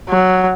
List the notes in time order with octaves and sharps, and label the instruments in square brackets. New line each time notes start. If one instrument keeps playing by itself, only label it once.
[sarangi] F#3